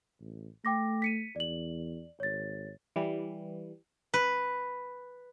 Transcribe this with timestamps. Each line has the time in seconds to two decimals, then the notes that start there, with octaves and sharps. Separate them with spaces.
0.20 A1
0.65 A3 G5 D6 A#6
1.02 B6 C#7 D#7
1.36 E2 D5 F#7
2.20 G#1 C#5 A6
2.96 E3 G3
4.14 B4